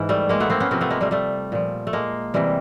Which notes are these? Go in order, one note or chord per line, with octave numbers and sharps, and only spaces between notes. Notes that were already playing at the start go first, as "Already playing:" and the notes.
Already playing: G#2 E3
G3 A3
G#3 A#3
A3 B3
A#3 C4
B3 C#4
C3 F3 A#3 C4
A3 B3
G#3 A#3
G3 A3
G3 A3
A#2 F3
A3
G#3 A#3
C3 E3 G3